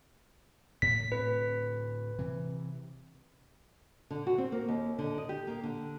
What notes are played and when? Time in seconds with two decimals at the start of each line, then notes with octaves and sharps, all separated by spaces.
0.82 A2 B6
1.12 D2 A2 C4 B4
2.19 C3 E3
4.10 D3
4.27 F#4
4.38 C4
4.52 A#3
4.68 D#2
4.99 D3
5.18 D#5
5.29 G4
5.47 A#3
5.64 D3